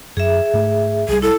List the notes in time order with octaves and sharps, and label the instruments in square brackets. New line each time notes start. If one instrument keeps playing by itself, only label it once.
[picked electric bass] F#2 [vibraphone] G#4 E5
[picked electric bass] G#2 A3
[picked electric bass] C2 G3 [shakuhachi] G#4
[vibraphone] E4 [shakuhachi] A4